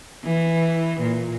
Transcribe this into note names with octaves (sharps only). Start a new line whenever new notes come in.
E3
A#2